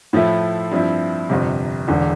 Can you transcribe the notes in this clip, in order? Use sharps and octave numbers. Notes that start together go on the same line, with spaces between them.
A2 F3 A3 E4
G2 F3 C4 E4
G1 F2 C3
E1 E2 D3